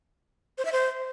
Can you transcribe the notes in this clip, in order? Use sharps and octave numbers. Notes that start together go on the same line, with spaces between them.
C5
E5
C5